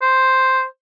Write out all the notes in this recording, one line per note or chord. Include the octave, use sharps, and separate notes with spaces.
C5